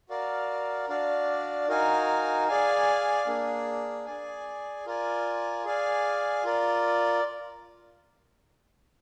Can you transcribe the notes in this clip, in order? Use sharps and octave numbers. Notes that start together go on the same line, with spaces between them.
F#4 A#4 D5 F5
D4 F#4 D5 F5
D#4 F#4 A#4 F5 G#5
G#4 D5 F5 G#5
A#3 D4 G#4
G#4 D5 G#5
F4 A#4 D5 G#5
G#4 D5 F5 G#5
F4 A#4 D5